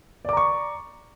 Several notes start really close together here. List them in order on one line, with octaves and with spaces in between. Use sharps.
D5 D6 A#5 C#6